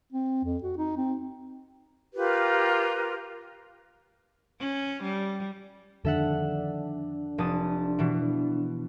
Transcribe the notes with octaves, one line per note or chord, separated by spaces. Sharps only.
C4
F2
F#4
D#4
C4
F4 G4 A#4 B4
C#4
G3
F2 D3 D#3 D4 A4 E5 F#5
F1 A5 D#6
B2 E3